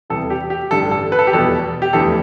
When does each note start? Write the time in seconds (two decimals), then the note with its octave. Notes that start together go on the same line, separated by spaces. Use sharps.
0.10 E2 C3 G3 A4
0.30 G4
0.50 G4
0.71 A1 G2 D3 G3 D4 A4
0.91 A4
1.12 B4
1.19 A4
1.27 G4
1.32 F1 E2 B2 G3 B3 A4
1.82 G4
1.93 F1 E2 D3 A3 A4